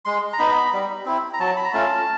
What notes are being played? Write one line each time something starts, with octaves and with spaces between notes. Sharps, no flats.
G#3 C6
A#5
B3 D#4 B5
G3
C4 E4
A#5
F#3 A5
B5
A#5
A3 C#4 F4 A5